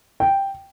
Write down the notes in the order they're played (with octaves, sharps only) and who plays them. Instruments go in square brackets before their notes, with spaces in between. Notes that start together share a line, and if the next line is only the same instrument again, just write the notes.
[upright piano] G5